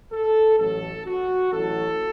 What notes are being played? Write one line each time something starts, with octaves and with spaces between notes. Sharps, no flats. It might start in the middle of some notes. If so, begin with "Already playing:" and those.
A4
A1 A2 F#3 A4
F#4
A1 A2 F#3 A4